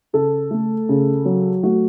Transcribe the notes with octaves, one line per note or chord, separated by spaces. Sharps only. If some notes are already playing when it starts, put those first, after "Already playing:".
C#3 A4
A3
C#3
F#3
A3 F#4